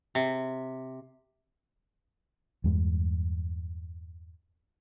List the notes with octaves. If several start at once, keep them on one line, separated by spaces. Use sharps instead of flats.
C3
E2 G2 G#3